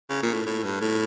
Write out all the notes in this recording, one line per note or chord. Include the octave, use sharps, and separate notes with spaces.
C#3
A#2
A2
A2
G2
A2